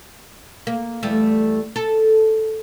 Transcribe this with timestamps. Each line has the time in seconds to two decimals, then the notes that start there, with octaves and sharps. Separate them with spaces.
0.67 A#3
1.03 E2 G3 A3
1.76 A4